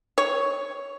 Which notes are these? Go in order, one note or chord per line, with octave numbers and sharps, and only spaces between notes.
C#5